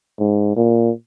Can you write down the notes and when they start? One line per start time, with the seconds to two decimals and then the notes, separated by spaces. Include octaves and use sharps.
0.19 G#2
0.56 A#2